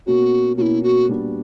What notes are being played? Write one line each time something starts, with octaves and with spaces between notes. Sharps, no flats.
B2 A#3 C#4 F#4
B2 A#3 C#4 E4 F#4
F#4
A#2 G3 B3 D4 F#4